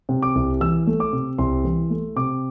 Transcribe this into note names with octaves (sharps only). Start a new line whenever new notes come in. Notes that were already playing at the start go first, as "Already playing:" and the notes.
C3
D6
C2
E3 E6
A3
D6
C3
C2 C6
E3
A3
C3 D6